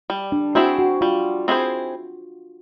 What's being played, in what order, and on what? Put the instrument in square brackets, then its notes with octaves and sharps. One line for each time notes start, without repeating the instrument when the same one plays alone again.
[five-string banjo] G3
[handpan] D4
[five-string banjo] C4 E4 G#4 C5 [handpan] F#4
[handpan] F#4
[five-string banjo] G3 [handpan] F4
[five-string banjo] C4 E4 G#4 C5